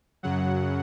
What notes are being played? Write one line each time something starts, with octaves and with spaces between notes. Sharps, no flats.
F#2 C#3 F#3 F#5